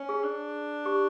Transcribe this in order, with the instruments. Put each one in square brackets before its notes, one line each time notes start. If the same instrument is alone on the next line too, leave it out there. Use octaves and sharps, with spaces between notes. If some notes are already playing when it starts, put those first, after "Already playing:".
Already playing: [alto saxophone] C#4
[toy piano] G#4
[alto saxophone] D4
[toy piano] G4